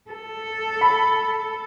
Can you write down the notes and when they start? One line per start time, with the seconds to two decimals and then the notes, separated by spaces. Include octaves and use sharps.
0.11 A4
0.81 B5